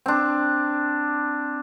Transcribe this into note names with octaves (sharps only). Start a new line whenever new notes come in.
C4 D4